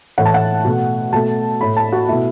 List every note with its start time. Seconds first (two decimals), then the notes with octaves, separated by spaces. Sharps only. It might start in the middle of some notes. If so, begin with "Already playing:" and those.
0.18 A2 E3 A3 F#5
0.25 A5
0.34 F#5
0.65 B2 A3
1.13 B2 A3 A5
1.60 A2 A3 B5
1.77 A5
1.92 F#4
2.08 B2 A3 E4